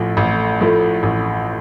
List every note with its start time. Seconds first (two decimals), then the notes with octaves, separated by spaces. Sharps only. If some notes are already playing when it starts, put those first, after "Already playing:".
Already playing: A1 A2 F3 A3
0.17 A1
0.61 A2 F3 A3
1.03 A1